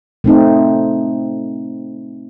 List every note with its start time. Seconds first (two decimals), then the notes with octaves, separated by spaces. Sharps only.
0.24 A3 C4 D#4